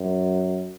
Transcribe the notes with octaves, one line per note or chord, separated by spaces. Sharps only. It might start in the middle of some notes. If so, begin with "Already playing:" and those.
Already playing: F#2